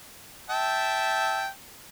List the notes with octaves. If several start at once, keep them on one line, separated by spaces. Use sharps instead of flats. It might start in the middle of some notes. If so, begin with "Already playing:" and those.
E5 G5 A5